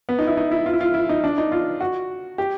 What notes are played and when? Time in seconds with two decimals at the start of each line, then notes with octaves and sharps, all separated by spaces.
0.09 B3
0.19 D#4
0.27 E4
0.37 D#4
0.51 E4
0.66 F4
0.73 E4
0.81 F4
0.94 E4
1.09 D#4
1.24 D4
1.38 D#4
1.52 F4
1.81 F#4
2.38 G4